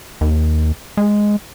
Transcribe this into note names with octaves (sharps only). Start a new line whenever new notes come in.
D#2
G#3